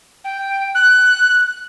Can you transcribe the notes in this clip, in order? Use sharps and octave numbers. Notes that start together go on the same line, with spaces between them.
G5
F#6